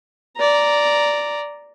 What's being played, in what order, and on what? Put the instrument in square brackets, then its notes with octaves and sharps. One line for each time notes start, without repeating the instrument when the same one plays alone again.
[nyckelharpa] D5 A#5